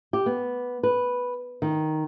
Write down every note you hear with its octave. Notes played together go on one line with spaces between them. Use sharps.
G4
B3
B4
D#3